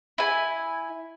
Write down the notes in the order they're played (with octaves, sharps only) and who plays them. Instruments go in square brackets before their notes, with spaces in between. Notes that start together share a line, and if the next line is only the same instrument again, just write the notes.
[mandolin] E4 G#5